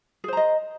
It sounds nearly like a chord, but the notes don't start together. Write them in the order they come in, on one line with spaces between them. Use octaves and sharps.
G#4 C5 A#5 D#5